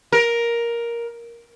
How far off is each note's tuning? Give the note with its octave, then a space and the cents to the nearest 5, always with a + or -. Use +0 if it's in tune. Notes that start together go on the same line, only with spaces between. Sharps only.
A#4 +10